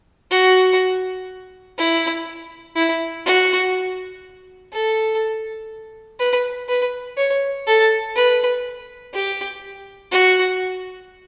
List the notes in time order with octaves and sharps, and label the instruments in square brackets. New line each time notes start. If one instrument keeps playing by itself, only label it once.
[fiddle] F#4
E4
E4
F#4
A4
B4
B4
C#5
A4
B4
G4
F#4